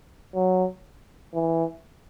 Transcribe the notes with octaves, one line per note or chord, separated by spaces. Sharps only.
F#3
E3